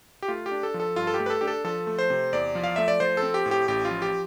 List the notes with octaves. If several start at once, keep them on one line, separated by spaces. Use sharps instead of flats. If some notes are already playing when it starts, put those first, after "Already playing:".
G4
A3 F4
G4
D4
A4
F3
A4
G2 F4
A4
G4
A3
B4
A4
D4 G4
A4
F3 A4
A3
C5
C3
E2 D5
F3
F5
A3 E5
D5
F3 C5
A4
C4
G4
A2
G4
A1 G4
F4
F3
G4